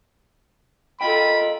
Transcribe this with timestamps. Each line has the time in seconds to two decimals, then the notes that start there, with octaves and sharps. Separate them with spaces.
1.01 F4 A4 D#5 G5 B5